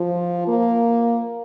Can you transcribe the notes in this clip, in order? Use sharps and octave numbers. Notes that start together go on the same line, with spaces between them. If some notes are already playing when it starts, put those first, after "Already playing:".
Already playing: F3
A#3